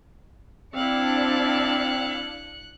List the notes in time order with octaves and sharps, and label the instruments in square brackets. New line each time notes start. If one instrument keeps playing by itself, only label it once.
[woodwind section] C4 [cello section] D4 [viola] E4 F5 [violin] F#6 C#7